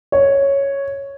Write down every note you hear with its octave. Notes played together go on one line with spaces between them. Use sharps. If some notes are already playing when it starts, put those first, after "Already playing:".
C#5